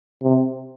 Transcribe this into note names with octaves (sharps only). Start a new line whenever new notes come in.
C3